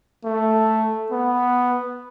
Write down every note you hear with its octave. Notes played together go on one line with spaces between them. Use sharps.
A3
B3